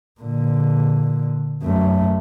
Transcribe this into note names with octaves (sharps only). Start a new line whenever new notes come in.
A#2 D3
F#2 A3